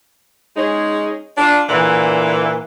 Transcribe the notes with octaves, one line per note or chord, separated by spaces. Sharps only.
G#3 C#4 D#4 G#4
D4 F4
A#2 D3 E3